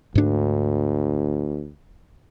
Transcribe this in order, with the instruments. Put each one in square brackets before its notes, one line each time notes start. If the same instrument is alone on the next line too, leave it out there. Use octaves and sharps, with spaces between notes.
[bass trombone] D2 [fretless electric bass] G#2 D4